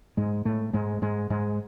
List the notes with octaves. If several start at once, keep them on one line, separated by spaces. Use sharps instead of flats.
G#2 G#3
A2 A3
G#2 G#3
G#2 G#3
G#2 G#3